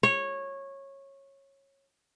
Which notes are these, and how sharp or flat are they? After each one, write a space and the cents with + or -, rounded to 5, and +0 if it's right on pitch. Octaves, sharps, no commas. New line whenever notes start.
C#5 -15